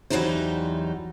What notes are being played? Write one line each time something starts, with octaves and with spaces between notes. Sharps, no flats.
E2 E3 F#3 G3 D#4 C5